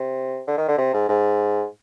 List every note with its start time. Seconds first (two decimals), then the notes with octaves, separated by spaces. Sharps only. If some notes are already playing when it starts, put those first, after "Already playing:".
Already playing: C3
0.48 D3
0.58 D#3
0.68 D3
0.78 C3
0.94 G#2
1.09 G#2